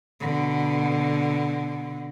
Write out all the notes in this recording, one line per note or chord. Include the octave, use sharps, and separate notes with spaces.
B2 D3